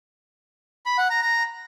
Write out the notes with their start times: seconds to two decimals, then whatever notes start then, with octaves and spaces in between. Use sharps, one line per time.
0.86 B5
0.98 F#5
1.10 A#5
1.22 A#5